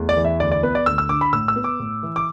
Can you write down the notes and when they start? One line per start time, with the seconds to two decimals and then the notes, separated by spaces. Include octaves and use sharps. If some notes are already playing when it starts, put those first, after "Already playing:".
Already playing: E2 A3
0.09 D5
0.16 E3
0.25 E5
0.40 D2 D5
0.52 D5
0.63 B3 B4
0.75 D5
0.86 D2 E6
0.98 E6
1.09 D3 D6
1.21 B5
1.33 A2 E6
1.48 E6
1.56 B3
1.64 D6
1.80 A2
2.03 E3
2.16 D6